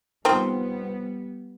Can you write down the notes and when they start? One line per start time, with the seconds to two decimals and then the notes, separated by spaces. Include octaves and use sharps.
0.25 D#3 F3 G3 B3 C4